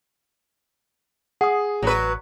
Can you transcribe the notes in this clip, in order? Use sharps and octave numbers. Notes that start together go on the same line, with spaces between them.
G#4 F#5 D#6
A1 F#3 B4 D5